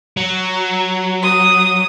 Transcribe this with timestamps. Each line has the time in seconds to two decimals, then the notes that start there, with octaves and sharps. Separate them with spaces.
0.17 F#3
1.23 D#6